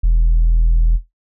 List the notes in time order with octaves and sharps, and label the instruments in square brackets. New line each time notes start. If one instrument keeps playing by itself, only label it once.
[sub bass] E1